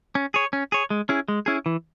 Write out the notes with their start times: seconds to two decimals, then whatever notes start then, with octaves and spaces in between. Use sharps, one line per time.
0.15 C#4
0.34 G#4 C#5
0.53 C#4
0.72 G#4 C#5
0.90 G#3
1.09 C#4 E4 G#4
1.28 G#3
1.46 C#4 E4 G#4
1.66 E3